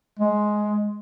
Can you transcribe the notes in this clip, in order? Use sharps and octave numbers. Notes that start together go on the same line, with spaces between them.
G#3